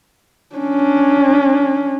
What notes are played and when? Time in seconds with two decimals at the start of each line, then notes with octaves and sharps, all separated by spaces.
0.56 C#4 D4